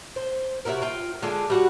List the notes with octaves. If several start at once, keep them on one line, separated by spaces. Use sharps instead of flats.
C5
C3 E4 F#4 A#4
F4 G5
D3 G#3 D4 F4
G3 F#4 F#5